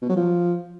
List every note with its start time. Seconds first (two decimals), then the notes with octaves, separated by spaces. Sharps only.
0.02 B2
0.09 F#3
0.16 F3